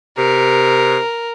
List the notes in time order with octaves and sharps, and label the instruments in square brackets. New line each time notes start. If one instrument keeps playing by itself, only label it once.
[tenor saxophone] C3 [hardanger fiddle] A#4